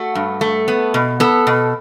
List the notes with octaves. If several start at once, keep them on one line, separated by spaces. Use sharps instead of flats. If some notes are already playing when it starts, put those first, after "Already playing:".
Already playing: A3 F#4
G2
A3
B3
B2
B3 A4
B2